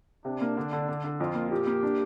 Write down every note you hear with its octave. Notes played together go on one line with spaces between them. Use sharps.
C3 D4
A#3
D3
D3
D3
D3
F2 F4
A#3
A#2 G4
A#3
D4